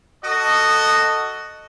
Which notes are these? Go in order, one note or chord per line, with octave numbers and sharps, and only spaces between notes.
F#4 A4 D#5 D#6